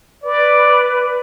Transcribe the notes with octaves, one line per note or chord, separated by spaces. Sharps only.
B4 D5